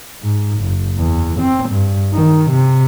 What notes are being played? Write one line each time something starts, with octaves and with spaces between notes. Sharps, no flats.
G#2
F#1
E2
C4
G2
D#3
C3